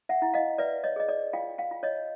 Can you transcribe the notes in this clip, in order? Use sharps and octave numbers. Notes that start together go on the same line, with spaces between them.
E5 F#5
E4
D#5 F5
B4 D5 E5
C#5 D#5
G#4 D#5
D5
F4 F5 G5
F5 G5
F4
C#5 D#5